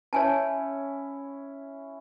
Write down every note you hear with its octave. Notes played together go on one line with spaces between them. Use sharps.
C#4 E4 C#5 G#5 A5